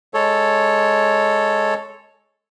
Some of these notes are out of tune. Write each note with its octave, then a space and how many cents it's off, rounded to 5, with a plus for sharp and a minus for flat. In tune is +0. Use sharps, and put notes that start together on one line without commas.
G#3 +0 A4 +0 C#5 +0